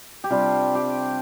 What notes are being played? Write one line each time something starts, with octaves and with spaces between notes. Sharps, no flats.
G4
C3 G3 D4 F4
G4